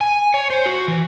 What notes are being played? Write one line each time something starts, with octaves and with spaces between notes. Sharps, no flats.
G#5
C#5
C5
F#4
E3